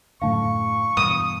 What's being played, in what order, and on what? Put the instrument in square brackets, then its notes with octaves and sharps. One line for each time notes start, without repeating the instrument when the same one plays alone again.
[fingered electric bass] F#2 A2 D3 [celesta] F5 A5 [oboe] C#6
[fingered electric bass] G2 B2 E3 [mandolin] D#6